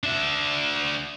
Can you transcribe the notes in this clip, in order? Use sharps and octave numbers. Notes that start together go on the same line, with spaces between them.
D4 E5